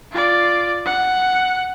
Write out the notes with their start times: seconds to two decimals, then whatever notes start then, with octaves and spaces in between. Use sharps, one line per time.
0.12 F4 D5
0.85 F#5